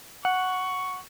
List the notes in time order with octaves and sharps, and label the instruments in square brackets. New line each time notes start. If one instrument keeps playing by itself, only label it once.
[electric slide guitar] F#5 [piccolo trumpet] C#6